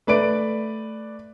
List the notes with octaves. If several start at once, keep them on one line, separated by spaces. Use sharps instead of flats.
A3 B4 D5 D7